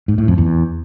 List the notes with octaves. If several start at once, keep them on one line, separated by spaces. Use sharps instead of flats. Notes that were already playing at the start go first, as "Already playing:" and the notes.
G#2
A2
F2
E2